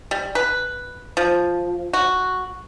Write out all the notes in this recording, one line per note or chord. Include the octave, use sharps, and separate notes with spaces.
G3
B4
F3
F#4